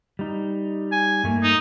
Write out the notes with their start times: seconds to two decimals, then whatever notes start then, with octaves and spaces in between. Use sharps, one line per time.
0.19 G3 D#4
0.92 G#5
1.24 G2 A3 A#3
1.43 D#4